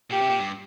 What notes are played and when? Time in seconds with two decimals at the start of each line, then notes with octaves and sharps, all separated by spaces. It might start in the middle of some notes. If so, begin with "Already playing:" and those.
0.11 A#2 G4
0.21 C3
0.30 A#2
0.39 G2